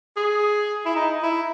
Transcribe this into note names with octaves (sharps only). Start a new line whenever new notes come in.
G#4
E4
D#4
E4